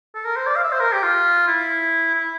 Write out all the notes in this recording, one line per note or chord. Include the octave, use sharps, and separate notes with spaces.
A4
A#4
C5
D5
F5
E5
C5
A#4
G4
F4
E4
E4